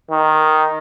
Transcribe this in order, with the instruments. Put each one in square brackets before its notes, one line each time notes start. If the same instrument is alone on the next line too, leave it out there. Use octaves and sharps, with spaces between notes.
[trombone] D#3